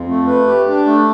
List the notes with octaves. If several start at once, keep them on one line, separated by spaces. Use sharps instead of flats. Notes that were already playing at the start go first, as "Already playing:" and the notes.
Already playing: F2
A3
B4
G4
D4
A3